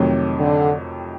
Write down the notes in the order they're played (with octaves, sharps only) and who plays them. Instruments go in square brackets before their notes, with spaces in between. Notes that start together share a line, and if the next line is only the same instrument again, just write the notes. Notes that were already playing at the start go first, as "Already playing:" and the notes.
Already playing: [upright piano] F2 C3 D#3 F#3 A3
[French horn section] D3